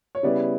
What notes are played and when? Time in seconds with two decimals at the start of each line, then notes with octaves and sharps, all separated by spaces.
0.15 C#5
0.23 C#3 G3 B3 E4 D5